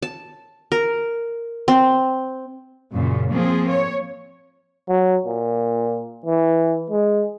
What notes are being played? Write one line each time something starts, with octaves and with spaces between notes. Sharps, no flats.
A5
A#4
C4
F#2 A#2 C#3
F3 A#3 C4 F4 G#4
C#5
F#3
A#2
E3
G#3